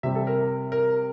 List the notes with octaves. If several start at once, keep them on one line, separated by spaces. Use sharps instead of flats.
C3 G3 C4 E5
A4
A#4
A#4